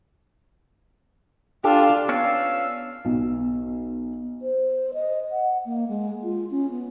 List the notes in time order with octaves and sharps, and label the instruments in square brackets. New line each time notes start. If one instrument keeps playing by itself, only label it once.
[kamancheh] D4 F4 [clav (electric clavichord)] G4 A4
[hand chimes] B3 [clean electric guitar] C#4 D4 [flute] F5 [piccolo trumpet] E6
[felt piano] B1
[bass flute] C5
D#5
F#5
A#3
G#3
F4
C#4
B3